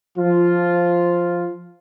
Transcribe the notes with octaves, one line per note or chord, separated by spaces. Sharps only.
F3 F4